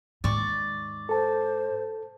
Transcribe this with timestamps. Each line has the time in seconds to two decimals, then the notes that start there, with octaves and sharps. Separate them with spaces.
0.24 D#2 G#2 D5 C#6
1.09 A4 C5 A5